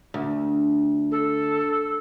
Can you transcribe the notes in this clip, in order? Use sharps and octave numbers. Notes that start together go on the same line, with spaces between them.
D2
A4